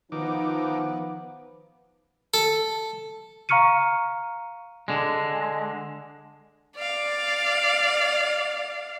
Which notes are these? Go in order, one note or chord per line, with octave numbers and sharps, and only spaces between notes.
D#3 F3 B3 D#4 B4 D6
A4
F5 A#5 C#6 F6 C#7 D#7
D3 G#3
D5 F5